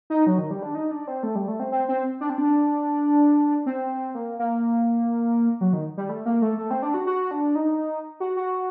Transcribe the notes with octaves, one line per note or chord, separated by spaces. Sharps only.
D#4
F#3
D#3
G3
D4
D#4
D4
C4
A3
G3
A3
C4
C4
C4
D4
C4
D4
C4
A#3
A#3
F#3
D#3
G3
A3
A#3
A3
A3
C4
D4
F#4
F#4
D4
D#4
F#4
F#4